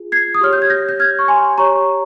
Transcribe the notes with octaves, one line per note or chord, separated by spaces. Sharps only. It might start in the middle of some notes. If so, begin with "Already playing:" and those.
Already playing: F4 G#4
G#6 C7
D#6
G4 C#5 F6
G6
G#6
G6 A#6
G6
F6 G#6
C#6
G#5 C6
G4 C#5 A#5 C#6